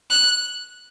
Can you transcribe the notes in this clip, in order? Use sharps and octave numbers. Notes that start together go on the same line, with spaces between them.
F#6